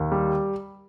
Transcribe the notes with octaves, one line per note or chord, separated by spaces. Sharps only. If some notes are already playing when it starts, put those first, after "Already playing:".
Already playing: D#2
G3